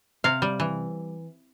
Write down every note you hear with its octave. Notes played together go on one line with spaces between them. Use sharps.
C3 F5
G3
E3